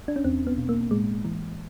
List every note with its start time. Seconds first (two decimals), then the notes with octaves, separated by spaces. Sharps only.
0.08 D4
0.16 C#4
0.24 E2 C4
0.47 B3
0.58 B2
0.69 A#3
0.91 A2 G#3
1.25 E3